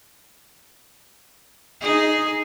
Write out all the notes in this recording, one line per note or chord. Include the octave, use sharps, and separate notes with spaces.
D#4 G#4